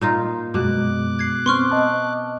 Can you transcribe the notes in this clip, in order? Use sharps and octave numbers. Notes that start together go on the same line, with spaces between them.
A#2 D#4 F4
F#2 B2 G#3 D6 F#6
G#6 C7
B3 C4 C6 C#6 F6
D#5 A5